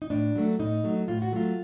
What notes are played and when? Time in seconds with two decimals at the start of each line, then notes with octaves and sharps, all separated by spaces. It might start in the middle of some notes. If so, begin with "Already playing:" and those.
0.02 D#4
0.10 A2 D4
0.35 F#3 A3
0.59 A2 D#4
0.84 F#3 A3
1.08 A2 F4
1.22 F#4
1.32 F#3 A3 F4